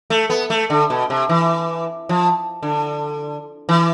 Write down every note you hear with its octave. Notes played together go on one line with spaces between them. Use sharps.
A3
B3
A3
D3
B2
C3
E3
F3
D3
E3